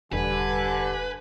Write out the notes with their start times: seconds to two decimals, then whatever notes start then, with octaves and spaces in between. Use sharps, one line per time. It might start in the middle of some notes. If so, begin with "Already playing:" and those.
0.13 E1 G2 D3 B4 G#5